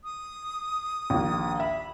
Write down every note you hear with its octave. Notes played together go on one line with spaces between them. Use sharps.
D#6
A#1 D#2
E5 B5